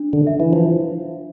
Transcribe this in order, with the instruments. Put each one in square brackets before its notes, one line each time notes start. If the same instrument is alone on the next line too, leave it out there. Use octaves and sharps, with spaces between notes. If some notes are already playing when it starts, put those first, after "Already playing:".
Already playing: [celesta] D4
[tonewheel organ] D3
[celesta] E5
[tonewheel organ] E3
F3